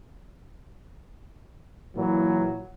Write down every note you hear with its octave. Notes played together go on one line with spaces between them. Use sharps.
A#2 E3 F#3